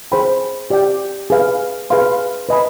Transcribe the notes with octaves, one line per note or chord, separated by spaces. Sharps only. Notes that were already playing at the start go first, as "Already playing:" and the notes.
G#4 C5 G5 B5
G4 D5 G5
G#4 B4 F5
G#4 B4 F5 C6
B4 D#5 G#5 B5